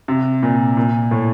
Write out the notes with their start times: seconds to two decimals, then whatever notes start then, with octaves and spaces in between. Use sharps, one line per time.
0.08 C3
0.43 A#2
0.77 A#2
1.11 A2